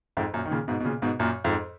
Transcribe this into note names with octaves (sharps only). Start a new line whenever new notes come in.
F2 G#2
F#2 A#2
D#3
A#2 C#3
G#2 B2
B2
A#2 C#3
G#2 B2
F#2 A#2
F2 G#2